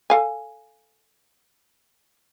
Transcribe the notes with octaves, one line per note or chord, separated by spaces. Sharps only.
A4 F5 G#5